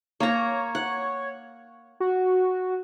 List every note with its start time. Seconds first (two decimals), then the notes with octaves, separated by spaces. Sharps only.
0.20 A#3 C#5 A#5
0.75 F#5
2.00 F#4